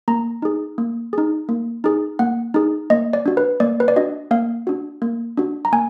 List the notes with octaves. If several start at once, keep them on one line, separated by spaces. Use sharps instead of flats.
A#3 A#5
D#4 G#4
A#3
D#4 G#4
A#3
D#4 G#4
A#3 F#5
D#4 G#4
A#3 D#5
D5
D4 F#4
B4
A#3 D5
B4
D5
D4 F#4 D#5
A#3 F5
D4 F#4
A#3
D4 F#4
A#5
A#3 G#5